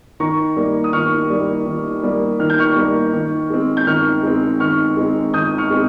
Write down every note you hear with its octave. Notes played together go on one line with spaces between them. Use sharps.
D#3 A#5 C#6
G3 A#3
D#6
D#3 C#6 F6
G3 A#3
D#3
G3 A#3
D#3 F6
G6
C#6 F6
G3 A#3
D#3
G#3 C4
G6
D#3 C#6 F6
G#3 C4
D#3 C#6 F6
G#3 C4
D#3 D#6 G6
C#6 F6
G#3 C4